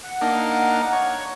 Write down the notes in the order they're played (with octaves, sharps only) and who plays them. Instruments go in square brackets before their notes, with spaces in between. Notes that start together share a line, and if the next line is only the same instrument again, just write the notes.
[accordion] F#5
[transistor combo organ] A#3 D4 D#4
C#5